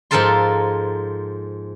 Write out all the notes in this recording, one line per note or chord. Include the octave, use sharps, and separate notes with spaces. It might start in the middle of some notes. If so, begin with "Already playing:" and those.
G#2 F3 A4 A#4 A5 C6